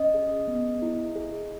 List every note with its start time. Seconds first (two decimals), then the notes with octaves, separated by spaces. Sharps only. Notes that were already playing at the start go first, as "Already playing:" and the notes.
Already playing: C#4 D#5
0.14 G#4
0.47 B3
0.82 E4
1.16 G#4